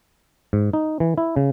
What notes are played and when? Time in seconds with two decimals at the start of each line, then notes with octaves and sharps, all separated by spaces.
0.53 G#2
0.73 D#4
1.00 E3
1.18 E4
1.36 C#3